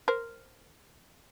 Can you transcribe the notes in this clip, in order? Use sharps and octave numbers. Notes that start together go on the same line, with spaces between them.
A#4 C5